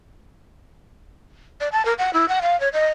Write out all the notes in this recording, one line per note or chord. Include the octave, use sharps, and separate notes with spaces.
D5
A5
A#4
F#5
E4
F#5
F5
C#5
D#5